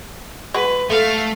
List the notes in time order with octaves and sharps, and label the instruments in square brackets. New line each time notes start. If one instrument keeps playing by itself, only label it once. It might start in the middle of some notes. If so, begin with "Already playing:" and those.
[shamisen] G#3 F#4 [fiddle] B4
[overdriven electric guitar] A3 [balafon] A4 [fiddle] F5